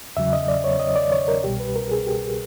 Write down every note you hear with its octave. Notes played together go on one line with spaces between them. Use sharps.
E2 C#3 F#3 E5
D#5
D5
C#5
D#5
D5
C#5
A#4
C2 B2 G3 G4
B4
A#4
G#4
G4